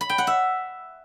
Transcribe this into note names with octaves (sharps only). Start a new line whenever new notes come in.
B5
G5
F#5
E5